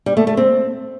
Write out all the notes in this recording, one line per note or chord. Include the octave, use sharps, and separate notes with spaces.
G3
A3
A3
C4